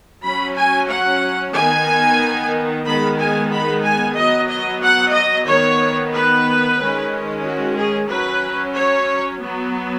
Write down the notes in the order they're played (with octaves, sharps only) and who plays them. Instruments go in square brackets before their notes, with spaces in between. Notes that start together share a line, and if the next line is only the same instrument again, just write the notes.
[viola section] F#3 C#4 B5
G#5
F#5
D#3 B3 G#5
D#3 G#3 B3 B5
G#5
B5
G#5
F#3 B3 D#5
D#5
F#5
D#5
D#3 B3 C#5
B4
D#3 G#3 C#4
F#4
G#4
F#3 C#4 B4
C#5
F#3 B3